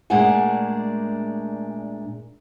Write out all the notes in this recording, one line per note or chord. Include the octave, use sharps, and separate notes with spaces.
A#2 G#3 A3 D4 F#5 G#5